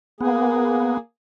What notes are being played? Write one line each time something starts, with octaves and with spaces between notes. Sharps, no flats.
A#3 B3 G#4